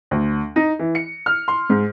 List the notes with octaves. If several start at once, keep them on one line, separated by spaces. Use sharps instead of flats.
D2
D#4
E3
C#7
F6
C6
G#2